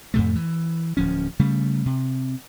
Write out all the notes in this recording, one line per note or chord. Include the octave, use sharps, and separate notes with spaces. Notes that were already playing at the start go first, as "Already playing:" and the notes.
F2 A2 C3 A3
E3
D1 F3 C#4
C#3 G3 A3
C3